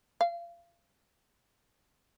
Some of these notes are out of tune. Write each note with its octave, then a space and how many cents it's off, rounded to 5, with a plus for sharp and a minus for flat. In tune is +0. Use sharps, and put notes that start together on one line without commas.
F5 -30